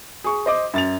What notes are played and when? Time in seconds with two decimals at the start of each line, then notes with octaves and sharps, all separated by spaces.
0.24 G#4 C#6
0.46 C5 D#5 D6
0.74 F#2 A6 F7